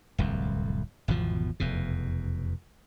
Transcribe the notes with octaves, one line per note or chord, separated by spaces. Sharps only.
D1 C2 F2
G#1 E2 B2 F3
F1 E2 B2